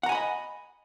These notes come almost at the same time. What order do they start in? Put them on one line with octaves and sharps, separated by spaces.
F#5 A#5 G#5 B5 D#5